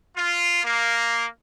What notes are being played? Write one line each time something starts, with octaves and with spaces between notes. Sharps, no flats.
F4
A#3